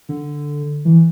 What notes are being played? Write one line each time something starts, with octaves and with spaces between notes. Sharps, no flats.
D3
E3